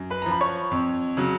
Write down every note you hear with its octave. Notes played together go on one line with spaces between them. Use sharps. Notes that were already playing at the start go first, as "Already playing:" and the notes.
Already playing: F#2
B4 B5
F3 A#5
B5
C#5 C#6
F2
C#3 F#3